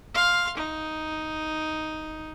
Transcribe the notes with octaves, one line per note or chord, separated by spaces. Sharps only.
F5 C6
D#4